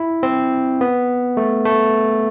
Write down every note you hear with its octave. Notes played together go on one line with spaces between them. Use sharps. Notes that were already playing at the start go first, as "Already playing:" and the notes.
Already playing: E4
C4
B3
A3
A3